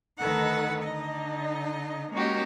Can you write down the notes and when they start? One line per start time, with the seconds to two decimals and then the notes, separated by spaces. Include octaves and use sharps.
0.19 D2 D#3 D#4 A4 B4 F#5
0.84 D3 D#4 D#5
2.12 G#3 A#3 C#4 D#4 F#4 G4